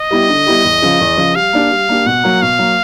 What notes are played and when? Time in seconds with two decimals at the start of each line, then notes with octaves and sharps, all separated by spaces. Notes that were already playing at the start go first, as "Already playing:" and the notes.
Already playing: D#5
0.11 G3 B3 E4 G4
0.29 D3
0.46 G3 B3 E4 G4
0.65 E2
0.82 C#3 F3
1.00 E2
1.17 C#3 F3
1.35 G3 F5
1.53 A#3 D4 G4
1.71 G3
1.89 A#3 D4 G4
2.06 B2 F#5
2.23 F#3 A#3
2.42 B2 F5
2.59 F#3 A#3